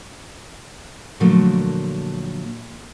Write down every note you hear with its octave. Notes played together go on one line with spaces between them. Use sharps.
A#2 D3 F3 F#3 A3 A#3